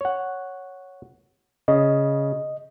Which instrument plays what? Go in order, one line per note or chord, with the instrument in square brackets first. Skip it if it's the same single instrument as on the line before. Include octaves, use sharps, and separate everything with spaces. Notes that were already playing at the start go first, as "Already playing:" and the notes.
[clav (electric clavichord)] C#5 F#5
[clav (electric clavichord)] C#3 [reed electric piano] D#5